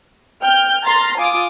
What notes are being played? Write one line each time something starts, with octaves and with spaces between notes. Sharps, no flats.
G5 F6 G6
A#5 C6 F6 A6 C7
F4 G#5 D6 D#6